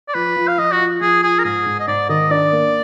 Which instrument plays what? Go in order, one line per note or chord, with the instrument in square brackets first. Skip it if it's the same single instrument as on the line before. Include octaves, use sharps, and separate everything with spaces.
[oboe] D5
[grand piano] F3 [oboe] B4
[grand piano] F3
[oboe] F5
[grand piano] F3 [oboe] D#5
[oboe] F#4
[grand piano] F4
[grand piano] F3 [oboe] G#4
[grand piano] F4 [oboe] G#4
[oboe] A#4
[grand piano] G#2 [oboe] G#4
[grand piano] G#2
[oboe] D#5
[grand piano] G#2 [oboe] D5
[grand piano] D#3 [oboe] D#5
[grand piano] D4 [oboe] D5
[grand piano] A#3